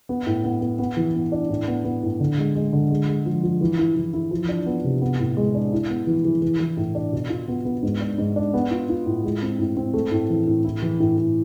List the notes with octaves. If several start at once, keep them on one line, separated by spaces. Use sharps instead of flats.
B3
A2
B3
B3
B3
E3
B3
D4
A2
B3
B3
A2
D3
G#3
G#3
D3
G#3
G#3
F3
F3
E3
E4
E3
E4
F3
D4
B3
C3
B3
A2
G#3
D4
E4
B3
E3
E3
E3
E3
A2
D4
B2
F4
B3
B3
G#2
D4
G#2
D4
B3
F4
F4
A2
G#3
C4
A2
C4
A3
A2
E3
A2
E4
E3
A2
A2